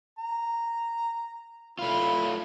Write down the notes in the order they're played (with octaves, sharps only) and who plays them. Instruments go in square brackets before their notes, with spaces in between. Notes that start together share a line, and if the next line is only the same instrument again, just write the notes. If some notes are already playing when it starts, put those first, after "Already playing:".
[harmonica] A#5
[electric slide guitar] A3 F4 [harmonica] E4 B4